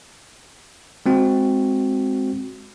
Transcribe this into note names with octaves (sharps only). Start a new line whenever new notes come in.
G#3 C4 F#4